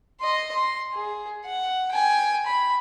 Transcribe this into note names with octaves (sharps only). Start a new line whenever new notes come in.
D#5 C6
C6
G#4
F#5
G5 G#5
B5